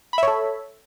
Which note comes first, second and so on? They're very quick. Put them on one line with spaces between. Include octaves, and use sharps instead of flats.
B5 E5 C#5 A4